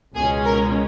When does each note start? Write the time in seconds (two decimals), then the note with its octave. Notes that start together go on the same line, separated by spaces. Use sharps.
0.15 C#2 B2 G#3 C#4 G#4
0.45 A#4